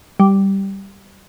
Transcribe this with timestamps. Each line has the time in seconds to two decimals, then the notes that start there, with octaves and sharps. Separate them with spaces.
0.20 G3